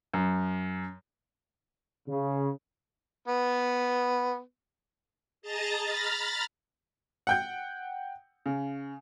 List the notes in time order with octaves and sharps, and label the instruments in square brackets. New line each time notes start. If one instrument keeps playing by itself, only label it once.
[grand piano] F#2
[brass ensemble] C#3
[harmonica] B3
[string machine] G#4 D#5 A5 A#5 A6
A#5 B5 F6 A6
[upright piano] F#5 G5 G6
C#3